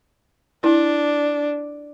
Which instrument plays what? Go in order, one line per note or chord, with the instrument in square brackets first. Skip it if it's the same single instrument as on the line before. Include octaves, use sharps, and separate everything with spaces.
[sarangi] D4 [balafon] E4